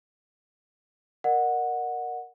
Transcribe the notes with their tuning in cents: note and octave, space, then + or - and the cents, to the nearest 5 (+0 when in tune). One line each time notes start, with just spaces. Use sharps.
A#4 +0 D#5 -45 F#5 -15